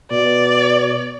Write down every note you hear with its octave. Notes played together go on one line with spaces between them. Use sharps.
B2 D5